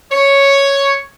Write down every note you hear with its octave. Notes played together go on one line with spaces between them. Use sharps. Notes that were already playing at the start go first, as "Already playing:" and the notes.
C#5